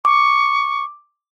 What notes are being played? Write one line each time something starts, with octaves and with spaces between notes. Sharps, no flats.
C#6 D6